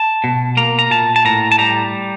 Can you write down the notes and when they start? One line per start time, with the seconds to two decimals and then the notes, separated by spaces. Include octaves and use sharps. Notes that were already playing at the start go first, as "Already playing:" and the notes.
Already playing: A5
0.24 B2
0.57 A#3 A#5
0.79 A#5
0.90 A#2 A5
1.16 A5
1.25 A2 A#5
1.52 A5
1.58 G3 A#5